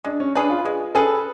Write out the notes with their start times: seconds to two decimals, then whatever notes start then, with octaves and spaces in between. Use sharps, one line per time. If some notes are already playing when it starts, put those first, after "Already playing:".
0.04 G#3 D4
0.20 C#4
0.35 C#4 D4 G#4 B4
0.50 F4
0.65 G#3 G#4
0.95 C#4 G#4 A4 B4